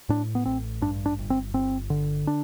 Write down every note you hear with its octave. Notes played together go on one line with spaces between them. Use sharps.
A2 D4
B3
A1 C4
G2 D4
D4
G1
C4
G1 C4
D3
D4